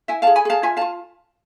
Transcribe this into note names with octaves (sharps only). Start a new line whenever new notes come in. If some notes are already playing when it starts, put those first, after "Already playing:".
E4 E5 G#5
G#4 F5 A5
G#5 B5
G#4 F5 A5
F4 E5 G#5
F4 F5 A5